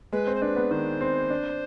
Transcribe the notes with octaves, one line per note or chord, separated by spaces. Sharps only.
G#3 B4
C4
C5
D4 B4
B3
D#3 C5
C4
D4